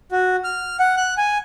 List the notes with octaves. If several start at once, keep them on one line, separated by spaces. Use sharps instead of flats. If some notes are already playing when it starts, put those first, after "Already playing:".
F#4
F6
F#5
F#6
G#5